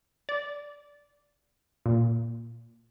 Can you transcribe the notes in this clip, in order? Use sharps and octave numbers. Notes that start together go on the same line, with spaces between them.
D5
A#2